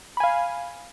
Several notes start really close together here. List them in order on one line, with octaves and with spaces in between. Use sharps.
B5 G#5 F5